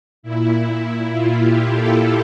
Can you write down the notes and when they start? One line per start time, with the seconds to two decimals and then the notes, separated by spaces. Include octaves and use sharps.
0.23 A#2 E4
1.11 F4
1.40 G4
1.68 A4